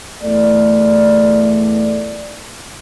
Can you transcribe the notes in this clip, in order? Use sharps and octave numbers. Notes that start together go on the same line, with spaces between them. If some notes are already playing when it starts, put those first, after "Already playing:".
E2 A3 D5